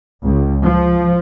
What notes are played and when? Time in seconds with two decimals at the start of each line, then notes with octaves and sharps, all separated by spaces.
0.24 C#2
0.63 F3